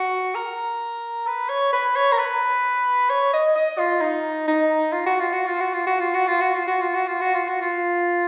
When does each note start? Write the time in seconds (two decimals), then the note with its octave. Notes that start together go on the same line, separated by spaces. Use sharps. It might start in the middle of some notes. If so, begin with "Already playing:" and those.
Already playing: F#4
0.35 A#4
1.27 B4
1.49 C#5
1.73 B4
1.96 C#5
2.12 A#4
2.18 B4
3.10 C#5
3.33 D#5
3.55 D#5
3.78 F4
4.01 D#4
4.48 D#4
4.93 F4
5.06 F#4
5.20 F4
5.33 F#4
5.46 F4
5.60 F#4
5.73 F4
5.87 F#4
6.00 F4
6.14 F#4
6.28 F4
6.40 F#4
6.54 F4
6.67 F#4
6.81 F4
6.94 F#4
7.07 F4
7.21 F#4
7.34 F4
7.48 F#4
7.61 F4